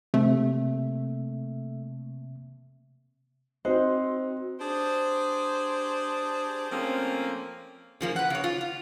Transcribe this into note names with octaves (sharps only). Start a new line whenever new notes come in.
C3 A3 A#3 E5
C4 D#4 F#4 C5
D4 G4 G#4 C5
F3 A3 A#3 C4 C#4
C#3 F3 A#3
B4 F#5
C#3 C#5
F4
F4